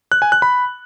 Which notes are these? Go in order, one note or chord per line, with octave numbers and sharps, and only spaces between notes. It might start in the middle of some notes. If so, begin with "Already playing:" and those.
F#6
G#5
F#6
B5